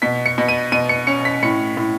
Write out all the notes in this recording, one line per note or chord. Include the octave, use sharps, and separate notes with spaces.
B2 B6
C#7
B2
D#7
B2 D#7
C#7
C#4 C#7
B6
A2 C#7
A2